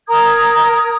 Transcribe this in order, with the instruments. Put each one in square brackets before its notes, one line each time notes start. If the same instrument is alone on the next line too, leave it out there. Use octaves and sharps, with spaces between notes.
[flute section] A#4 A#5 D#6 G#6